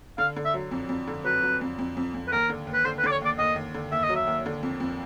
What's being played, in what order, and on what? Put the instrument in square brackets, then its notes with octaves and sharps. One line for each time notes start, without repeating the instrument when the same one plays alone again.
[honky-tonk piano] D3 [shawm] F5
[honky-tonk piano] D3
[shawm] E5
[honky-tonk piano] F#3
F2
F2
D3
[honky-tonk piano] F#3 [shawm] B4
[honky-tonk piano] F#3
F2
F2
F2
F2
[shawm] B4
[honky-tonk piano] D#2 [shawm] A#4
[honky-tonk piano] D3
D#2
[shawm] B4
[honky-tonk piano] D3 [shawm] C5
[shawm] B4
[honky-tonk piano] D3 [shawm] D5
[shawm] C#5
[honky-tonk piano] D#2 [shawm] D5
[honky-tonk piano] D#2 [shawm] D#5
[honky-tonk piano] D#2
D3
[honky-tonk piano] D#2 [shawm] E5
[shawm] D#5
[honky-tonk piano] F#3
[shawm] E5
[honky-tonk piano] D#2
D3
F2
F2